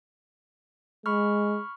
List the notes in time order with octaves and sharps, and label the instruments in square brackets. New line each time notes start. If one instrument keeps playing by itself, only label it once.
[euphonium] G#3 [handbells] B5 C#6 F6